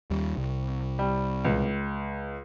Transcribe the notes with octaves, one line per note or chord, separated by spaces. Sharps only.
D#2 G3
C2
G3
C#2